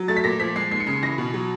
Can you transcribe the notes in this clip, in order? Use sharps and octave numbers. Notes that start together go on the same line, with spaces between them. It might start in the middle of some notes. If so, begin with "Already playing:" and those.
Already playing: F#3
A3 A6
B6
A#2 A#6
F3 B6
G#3 C7
D#2 C7
C#7
C#3 C7
E3 A#6
B2
F#3